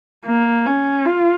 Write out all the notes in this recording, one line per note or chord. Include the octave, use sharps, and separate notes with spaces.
A#3
C#4
F4